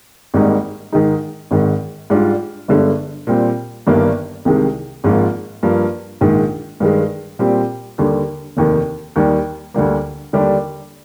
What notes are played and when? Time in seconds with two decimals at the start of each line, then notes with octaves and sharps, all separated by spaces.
0.34 G#1 G#2 G3 A#3 D#4
0.92 G#2 D#3 G#3 D#4
1.51 G#1 G#2 D#3
2.10 G#2 G3 D4 F4
2.68 G1 G2 D3 G#3
3.27 A#2 G3 C4
3.87 G1 G2 D#3 A#3 D4
4.45 C2 C3 D#3 G#3
5.04 G#1 G#2 F3 A#3 F4
5.63 G2 F3 A#3
6.21 A#1 G#2 D#3 G#3
6.80 G2 D#3 G#3
7.39 A#2 G3 C4 G4
7.98 D#2 D3 G3
8.57 F1 D#2 D#3
9.16 D#2 D#3 G3
9.74 D2 D3 G3 A#3
10.33 D#2 D3 G3 D4 G4